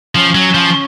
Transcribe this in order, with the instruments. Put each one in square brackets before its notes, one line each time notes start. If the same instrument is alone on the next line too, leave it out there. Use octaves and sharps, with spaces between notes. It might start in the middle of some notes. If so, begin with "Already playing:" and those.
[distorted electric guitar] F3 [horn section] C#4
[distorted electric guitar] F#3
F3